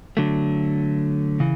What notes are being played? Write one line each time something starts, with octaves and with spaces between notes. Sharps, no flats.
D3 F#3 A3
C#3 E3